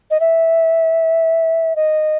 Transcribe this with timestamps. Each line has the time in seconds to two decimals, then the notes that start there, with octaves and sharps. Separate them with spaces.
0.10 D#5
0.20 E5
1.76 D#5